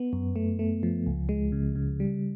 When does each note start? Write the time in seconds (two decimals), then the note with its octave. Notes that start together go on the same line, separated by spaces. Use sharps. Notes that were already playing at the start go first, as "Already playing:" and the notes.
Already playing: B3
0.13 F#2
0.36 A3
0.59 A3
0.83 F3
1.06 C#2
1.29 G#3
1.52 C#3
1.76 C#3
2.00 G3